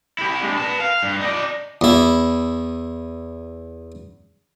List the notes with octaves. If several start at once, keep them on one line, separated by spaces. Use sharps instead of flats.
E4 G4
G#3 D4
B4 A5
F5
G2
D#4 D5
E2 E4